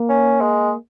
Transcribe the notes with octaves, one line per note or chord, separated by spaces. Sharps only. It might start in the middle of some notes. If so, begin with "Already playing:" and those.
Already playing: A#3
C#4
G#3